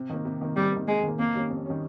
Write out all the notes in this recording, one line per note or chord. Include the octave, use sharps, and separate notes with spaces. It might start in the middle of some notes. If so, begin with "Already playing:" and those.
Already playing: C3
D#3 A#3
C3
D#3 A#3
C3 G3
D#3 A#3
C3 G#3
D#3 A#3
F2 A#3
D#3 G3 C#4
F2
D#3 G3 C#4